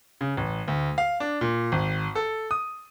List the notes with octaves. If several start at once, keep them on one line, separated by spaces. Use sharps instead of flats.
C#3
A1
D2
F5
D4
A#2
G#1
A4
D#6